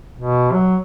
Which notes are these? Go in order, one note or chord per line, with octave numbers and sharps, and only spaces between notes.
B2
F#3